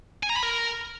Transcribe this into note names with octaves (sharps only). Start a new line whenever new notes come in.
G#5
A#5
B5
A#4